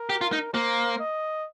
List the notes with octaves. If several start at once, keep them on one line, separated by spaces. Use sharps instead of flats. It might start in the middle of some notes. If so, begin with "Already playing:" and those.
Already playing: A#4
G4
F4
D#4
A#3 C5
D#5